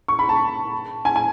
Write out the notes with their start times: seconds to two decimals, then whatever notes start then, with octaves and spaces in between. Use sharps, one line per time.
0.08 C#6
0.19 B5
0.29 A5
1.05 G#5
1.16 G#5